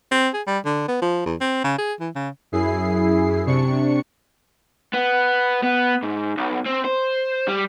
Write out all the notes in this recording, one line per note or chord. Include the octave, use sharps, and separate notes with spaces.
C4
G#4
G3
D3
B3
F3
E2
C4
C#3
G#4
E3
C#3
F#2 E4 G#4 C7
C3 D4 C#6 C#7
B3
B3
G#2
B1
C4
C5
G3